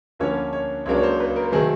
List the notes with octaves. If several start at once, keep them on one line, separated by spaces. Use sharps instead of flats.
D2 D3 F3 A#3 C#4 C#5
C#5
C#2 C#3 F#3 A#3 D4 C#5
C#5
C5
B4
A#4
C3 D#3 F#3 A3 C4 G#4